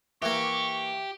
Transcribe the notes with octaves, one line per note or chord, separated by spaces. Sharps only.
E3 A#3 G4 C#6